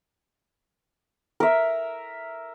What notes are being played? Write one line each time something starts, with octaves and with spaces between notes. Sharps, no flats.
A#4 E5